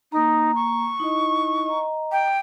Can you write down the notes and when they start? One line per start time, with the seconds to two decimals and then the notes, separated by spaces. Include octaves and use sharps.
0.12 A#3 D#4 A#5
0.55 C#6
1.00 D#4 E4 D#5
1.66 D#5 A#5
2.12 G5